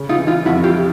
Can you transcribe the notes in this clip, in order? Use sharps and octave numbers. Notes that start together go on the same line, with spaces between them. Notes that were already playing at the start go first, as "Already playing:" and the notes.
Already playing: C#3
D#4 F4
E3
D#4 F4
F2 E4 F#4
F4 G4